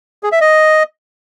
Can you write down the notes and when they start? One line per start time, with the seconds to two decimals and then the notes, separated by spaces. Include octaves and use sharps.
0.23 G#4
0.32 E5
0.41 D#5